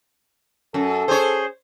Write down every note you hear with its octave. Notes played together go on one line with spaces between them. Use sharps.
F#2 A4
G#4 C5 C#5